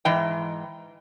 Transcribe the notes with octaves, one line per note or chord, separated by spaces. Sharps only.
G#2 E3 G5